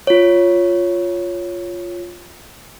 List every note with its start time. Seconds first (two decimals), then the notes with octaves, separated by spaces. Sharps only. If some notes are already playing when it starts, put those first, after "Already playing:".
0.07 F4 C#5